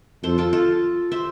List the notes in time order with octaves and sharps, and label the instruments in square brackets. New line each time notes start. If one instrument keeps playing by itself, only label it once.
[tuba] F2 [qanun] A4 C5
[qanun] F4 A4
F4 A4
C5 E5